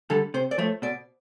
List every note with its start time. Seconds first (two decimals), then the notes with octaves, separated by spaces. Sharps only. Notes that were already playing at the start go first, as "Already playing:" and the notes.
0.10 D3 G3 A4
0.34 C3 C5
0.51 D5
0.58 F3 A3 C#5
0.82 B2 D5